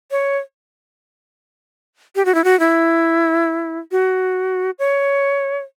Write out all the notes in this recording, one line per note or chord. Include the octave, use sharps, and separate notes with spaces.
C#5
G4
F#4
E4
F#4
E4
F#4
C#5